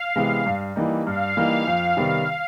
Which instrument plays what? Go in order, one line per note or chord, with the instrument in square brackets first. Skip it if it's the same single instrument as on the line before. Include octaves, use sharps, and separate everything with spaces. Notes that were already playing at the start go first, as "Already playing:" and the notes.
Already playing: [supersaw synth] F5
[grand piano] C3 E3 G#3 B3
G2
E3 G3 A#3 D#4
[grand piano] G2 [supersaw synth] F5
[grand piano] E3 G3 A#3 D#4
F2
C3 D#3 G3 B3